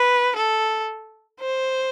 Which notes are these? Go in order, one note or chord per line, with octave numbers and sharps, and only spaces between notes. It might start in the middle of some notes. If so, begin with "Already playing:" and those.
Already playing: B4
A4
C5